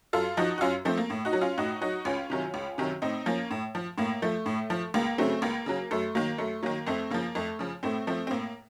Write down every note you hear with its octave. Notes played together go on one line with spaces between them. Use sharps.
F#2 F4 A4
F3 D#4 F#4
F#4
F#2 C#4 F4
F3 A3 C4
A#3
A2
D#4 F#4
F#3
C#4 F4
A2 D#4 F#4
F#3 D#4 F#4
C#2 C#4 F4
C3 D#3 F#3
C#2
C3 D#3 F#3
A2 C4 D#4
F3 A#3 C#4
A2
F3
A2 A#3
F3 A3
A2
F3
C#2 A#3
C#3 F#3 A3 C4
C#2 A#3
C#3 F#3
F#2 A3
D#3 F#3 A#3
F#2 A3
D#3 F#3 A#3
F2 A3 C4
C#3 F3 A#3
F2 A3
C#3 F3
A2 A3 C4
F3 A3 C4
C4
A2 A#3